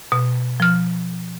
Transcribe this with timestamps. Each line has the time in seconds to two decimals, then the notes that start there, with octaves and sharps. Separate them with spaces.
0.12 B2
0.60 F3 F6